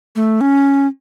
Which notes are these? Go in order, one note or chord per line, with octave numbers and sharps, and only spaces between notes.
A3
C#4